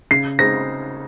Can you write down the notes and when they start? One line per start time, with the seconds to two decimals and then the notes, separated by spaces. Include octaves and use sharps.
0.11 C#3 C7
0.39 G#3 C4 D#4 A#6